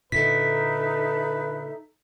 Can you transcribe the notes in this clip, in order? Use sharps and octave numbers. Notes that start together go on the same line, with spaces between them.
A#2 D3 D#4 A4 B4 E5 B6